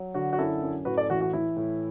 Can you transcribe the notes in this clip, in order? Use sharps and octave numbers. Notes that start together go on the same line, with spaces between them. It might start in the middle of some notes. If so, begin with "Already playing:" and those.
Already playing: F#3
D3 F#4
F#4
F#2 E4 A4
F#2
A2 F#4 B4
A4 D5
E3 F#4
F#4
E3 E4
A2